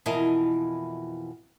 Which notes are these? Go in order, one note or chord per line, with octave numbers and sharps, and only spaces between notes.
F2 B2 E3 E4 A#4 D#5